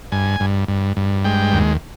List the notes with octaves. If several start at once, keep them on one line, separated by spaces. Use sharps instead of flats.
G2 G#5
G2
G2
G2
G#3 G5
D#2